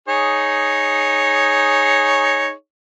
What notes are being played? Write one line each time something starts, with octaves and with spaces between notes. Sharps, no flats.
D#4 G#4 C#5